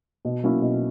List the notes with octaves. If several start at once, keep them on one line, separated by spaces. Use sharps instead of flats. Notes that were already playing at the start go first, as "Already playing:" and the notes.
B2
F#3 A#3 C#4 E4
B2